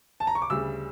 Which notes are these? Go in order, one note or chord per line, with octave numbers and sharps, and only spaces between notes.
A5
A#5
C#6
D6
D2 C#3 G3 E6